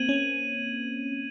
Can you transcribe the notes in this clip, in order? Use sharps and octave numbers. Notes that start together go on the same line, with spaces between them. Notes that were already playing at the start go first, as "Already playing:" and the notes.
Already playing: A#3 C4 G#6 D#7 F#7
C#4